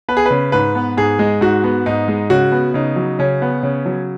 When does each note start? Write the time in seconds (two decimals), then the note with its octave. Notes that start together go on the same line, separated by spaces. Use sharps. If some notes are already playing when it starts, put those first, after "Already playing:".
0.08 B3 B4
0.17 G#4
0.26 C#3 B4
0.52 G#2 B4
0.75 B3
0.97 G#2 G#4
1.19 G#3
1.41 G#2 F#4
1.64 B3
1.86 G#2 D#4
2.08 G#3
2.30 C#3 F#4
2.52 B3
2.74 C#3 D#4
2.96 F#3
3.19 C#3 C#4
3.42 B3
3.63 C#3
3.86 F#3